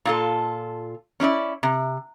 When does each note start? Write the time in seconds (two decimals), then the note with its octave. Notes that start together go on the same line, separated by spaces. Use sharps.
0.05 A#2 F4 A4
1.20 C#4 D4 E4 D5
1.63 C3